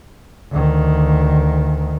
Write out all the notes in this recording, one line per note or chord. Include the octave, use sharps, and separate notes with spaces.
D2 D#3